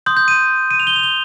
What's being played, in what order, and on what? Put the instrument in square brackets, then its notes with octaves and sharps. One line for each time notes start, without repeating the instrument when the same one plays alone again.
[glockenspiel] C6 D#6 G6
G6
D#7
D#7
F7
G7
F7
G7